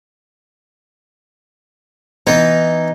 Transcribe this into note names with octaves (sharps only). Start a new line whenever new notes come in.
E3 B3 D#4